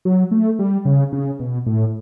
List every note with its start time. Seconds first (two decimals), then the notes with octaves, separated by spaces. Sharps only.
0.05 F#3
0.31 A3
0.59 G3
0.85 C#3
1.12 C#3
1.40 B2
1.66 A2